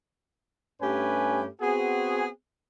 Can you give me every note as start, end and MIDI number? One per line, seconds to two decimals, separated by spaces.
0.82 1.45 43
0.82 1.45 57
0.82 1.45 61
0.82 1.45 67
0.82 1.45 71
0.82 1.45 80
1.61 2.27 59
1.61 2.27 60
1.61 2.27 66
1.61 2.27 68